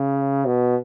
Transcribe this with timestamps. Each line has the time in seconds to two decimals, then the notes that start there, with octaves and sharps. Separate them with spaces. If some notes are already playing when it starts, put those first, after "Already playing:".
Already playing: C#3
0.45 B2